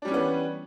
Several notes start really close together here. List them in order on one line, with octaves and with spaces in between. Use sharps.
D4 G3 C#4 E3 B3